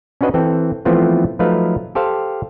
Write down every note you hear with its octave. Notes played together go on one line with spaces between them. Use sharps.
C#4 D4 F#4 B4 D#5
E3 C4 A4 G5
E3 F3 A3 B3 C4 F4
F3 F#3 A3 D#4 B4 F5
G4 A4 C5 F5